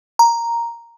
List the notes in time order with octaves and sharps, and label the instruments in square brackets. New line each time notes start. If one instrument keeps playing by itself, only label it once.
[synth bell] A#5